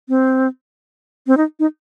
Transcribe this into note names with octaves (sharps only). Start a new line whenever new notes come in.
C4
C4
D#4
D#4